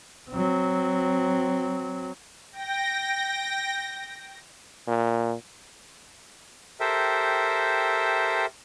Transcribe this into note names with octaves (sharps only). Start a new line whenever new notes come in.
F#3 C4
G5 A#6
A#2
G4 A4 A#4 C5 E5 G5